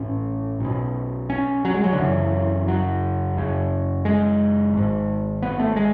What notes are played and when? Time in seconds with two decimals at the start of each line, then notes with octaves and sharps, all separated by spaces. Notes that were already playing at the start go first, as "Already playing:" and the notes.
Already playing: A1 A2 C#4
0.60 B1 B2
1.30 C#4
1.65 F#3
1.74 G#3
1.84 F#3
1.93 D3
1.98 F#1 F#2 C#3 E3
2.68 F#3
3.36 F#1 F#2 C#3
4.05 G#3
4.74 G#1 G#2
5.42 B3
5.60 A3
5.76 G#3